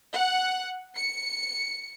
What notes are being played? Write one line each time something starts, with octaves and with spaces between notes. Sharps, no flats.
F#5
C#7